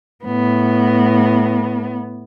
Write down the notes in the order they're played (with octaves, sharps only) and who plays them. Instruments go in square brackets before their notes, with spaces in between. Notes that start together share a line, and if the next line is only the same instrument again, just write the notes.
[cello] A2 B3